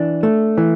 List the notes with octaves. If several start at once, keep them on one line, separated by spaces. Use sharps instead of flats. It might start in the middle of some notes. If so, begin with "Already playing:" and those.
Already playing: E3 D4
A3
E3